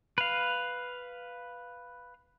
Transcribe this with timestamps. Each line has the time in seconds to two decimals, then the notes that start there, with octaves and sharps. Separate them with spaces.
0.18 B4 F5